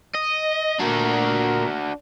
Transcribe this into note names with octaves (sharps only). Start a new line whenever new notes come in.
D#5
A#2 D4 F#4 A#4